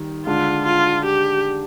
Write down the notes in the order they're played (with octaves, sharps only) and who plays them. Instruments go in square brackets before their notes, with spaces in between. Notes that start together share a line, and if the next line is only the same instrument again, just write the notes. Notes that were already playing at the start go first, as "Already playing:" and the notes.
Already playing: [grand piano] D#3 G3
[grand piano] D3 G#3 D4 [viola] F4
[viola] F4
G4